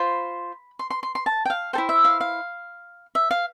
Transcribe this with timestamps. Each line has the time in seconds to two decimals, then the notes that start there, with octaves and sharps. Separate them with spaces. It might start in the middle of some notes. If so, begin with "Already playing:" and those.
Already playing: F4 C5 B5
0.79 C6
0.90 C6
1.03 C6
1.15 C6
1.26 A5
1.45 G5
1.50 F5
1.73 A4 C5 G5
1.78 E4
1.89 E5
2.05 F5
2.21 F5
3.15 E5
3.31 F5